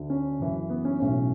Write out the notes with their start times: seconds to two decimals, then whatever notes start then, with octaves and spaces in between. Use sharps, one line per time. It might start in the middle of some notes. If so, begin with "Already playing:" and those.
Already playing: D2 D3
0.10 C#4
0.39 F#1 F#2 E3
0.70 B3
0.85 C#4
1.00 B1 A2 E3 C#4